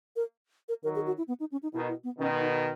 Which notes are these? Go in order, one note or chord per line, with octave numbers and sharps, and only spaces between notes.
A#4
A#4
D#3 F#3 A#4
G#4
F#4
E4
B3
D#4
C#4
D#4
B2 D#3 E4
E4
B3
B2 D#3 C#4
D#4